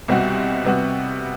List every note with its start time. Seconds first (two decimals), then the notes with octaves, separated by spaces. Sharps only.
0.08 C2 B2 G3 C4 F#4
0.64 C3 G3 B3 F#4